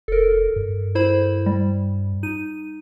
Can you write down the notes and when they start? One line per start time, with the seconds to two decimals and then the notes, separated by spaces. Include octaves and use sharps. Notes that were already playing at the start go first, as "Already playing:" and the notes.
0.08 F1 A4 A#4
0.56 G2
0.95 E4 C5 B5
1.46 G3
2.23 D#4 D#7